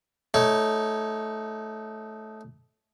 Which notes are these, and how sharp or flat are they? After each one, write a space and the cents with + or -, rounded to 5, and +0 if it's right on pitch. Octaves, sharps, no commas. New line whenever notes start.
A3 -15 D#4 +0 C#5 +0